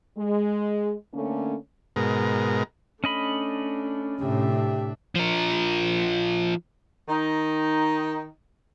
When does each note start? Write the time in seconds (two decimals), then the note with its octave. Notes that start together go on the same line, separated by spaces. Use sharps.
0.18 G#3
1.14 D3 A3 A#3 C#4
1.96 G#2 B2 A#4
3.04 A3 C#4 D4 D#5 B5
4.21 A2 C3 D4 G4 E5
5.15 F3 A#4
7.09 D#3 D#4